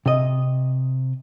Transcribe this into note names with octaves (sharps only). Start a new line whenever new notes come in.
C3 D#5